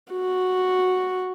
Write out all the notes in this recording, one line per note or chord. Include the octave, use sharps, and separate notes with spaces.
F#4